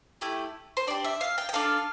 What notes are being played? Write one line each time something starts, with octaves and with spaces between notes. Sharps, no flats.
A3 E4 G4
C5
D4 G4 D5
E5
F5
G5
G5
D4 F4 A4 F5